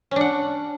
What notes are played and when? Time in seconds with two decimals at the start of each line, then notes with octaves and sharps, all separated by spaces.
0.11 C#4
0.16 D4
0.21 F#5